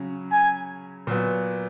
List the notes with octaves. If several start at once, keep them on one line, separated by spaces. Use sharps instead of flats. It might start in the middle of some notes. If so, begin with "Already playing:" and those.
Already playing: C#3 F#3 C#4
G#5
A#2 F#3 B3